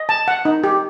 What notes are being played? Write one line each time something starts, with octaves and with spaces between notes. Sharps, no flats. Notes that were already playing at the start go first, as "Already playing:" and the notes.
Already playing: D#5
A5
F#5
D#4
G4